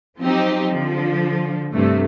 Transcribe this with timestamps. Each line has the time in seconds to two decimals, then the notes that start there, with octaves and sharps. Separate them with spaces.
0.19 F3 F#3 C4 D#4 G4
0.71 D3 F3
1.73 G2 C3 A3